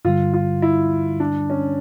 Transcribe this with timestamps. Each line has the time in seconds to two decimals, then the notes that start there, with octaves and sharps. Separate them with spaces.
0.05 G2 D3 G3 F4
0.33 F4
0.62 E4
1.20 D4
1.50 C#4